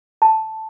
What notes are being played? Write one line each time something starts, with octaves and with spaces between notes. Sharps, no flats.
A5